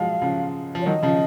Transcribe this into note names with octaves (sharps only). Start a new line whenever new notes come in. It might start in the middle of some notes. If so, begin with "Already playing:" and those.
Already playing: F3 F#3 G#3 F5
C#3 F3
F3
C#5
D#3 F#3 D#5
C#3 F3